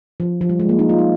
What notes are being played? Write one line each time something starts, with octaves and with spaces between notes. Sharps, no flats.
F3
F3
G3
G#3
A#3
D#4
F4
D#4